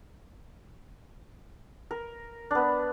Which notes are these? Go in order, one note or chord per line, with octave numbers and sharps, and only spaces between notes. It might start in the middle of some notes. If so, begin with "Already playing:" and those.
A#4
B3 D4